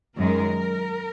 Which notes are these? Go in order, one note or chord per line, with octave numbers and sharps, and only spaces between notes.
F#2 D#3 G#3 A#4